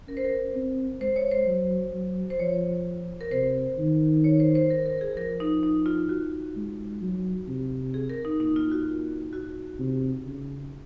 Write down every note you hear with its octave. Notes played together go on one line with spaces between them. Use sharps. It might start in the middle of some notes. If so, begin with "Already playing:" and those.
C#4 A#4
C5
A#4
C4
G#3 C5
C#5
C5
F#3
F#3
C5
F3 C#5
A#4
C3 C5
D#3
C#5
C5
C5
A#4
A#4
G#4
F3 A#4
D#4
D#4
F4
F#4
G#3
F#3
C3
G#4
A#4
D#4
A#2 D#4
F4
F#4
F#4
C3
C#3